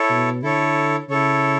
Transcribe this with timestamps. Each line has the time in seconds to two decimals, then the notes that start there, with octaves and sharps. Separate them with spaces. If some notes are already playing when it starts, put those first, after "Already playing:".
Already playing: E4 A4 C#5
0.10 B2
0.43 D3 E4 A4 C#5
1.10 C#3 E4 A4 C#5